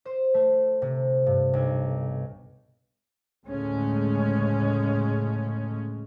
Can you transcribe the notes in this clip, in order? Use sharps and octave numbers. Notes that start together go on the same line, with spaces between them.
C5
A3
C3
G2
B1
D2 A2 C#3 G#3 A3 C#4